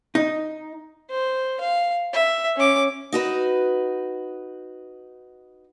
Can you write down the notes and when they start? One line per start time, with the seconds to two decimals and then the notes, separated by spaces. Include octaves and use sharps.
0.15 D#4
1.10 C5
1.60 F5
2.13 E5
2.56 C#4 D6
3.12 D#4 F#4 B4